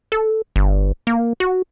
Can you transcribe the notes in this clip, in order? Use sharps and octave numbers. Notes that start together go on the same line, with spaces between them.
A4
G1
A#3
F#4